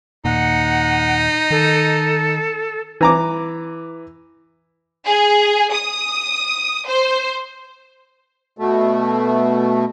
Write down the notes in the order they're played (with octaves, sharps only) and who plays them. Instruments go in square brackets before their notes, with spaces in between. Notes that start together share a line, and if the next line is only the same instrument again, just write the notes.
[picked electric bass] D#2 A#2 [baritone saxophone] D#4 [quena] F#5
[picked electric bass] D#3 [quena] A4
[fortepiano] E3 A#5 D6
[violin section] G#4
D#6
C5
[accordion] B2 A3